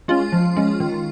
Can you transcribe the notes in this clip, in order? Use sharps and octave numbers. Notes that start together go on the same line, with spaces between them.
G#3 C#4 F4
F3
G#3 C#4
D#3